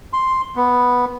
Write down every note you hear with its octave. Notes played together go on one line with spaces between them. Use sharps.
C6
B3